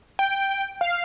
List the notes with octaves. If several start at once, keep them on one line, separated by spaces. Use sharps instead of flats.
G5
F5